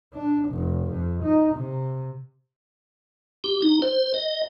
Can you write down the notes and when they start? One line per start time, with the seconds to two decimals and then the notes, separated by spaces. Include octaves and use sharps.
0.14 D4
0.50 F1
0.92 F2
1.24 D#4
1.55 C3
3.44 G4
3.62 D#4
3.82 C5
4.14 D#5